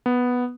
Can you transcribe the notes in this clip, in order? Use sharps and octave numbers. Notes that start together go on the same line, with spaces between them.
B3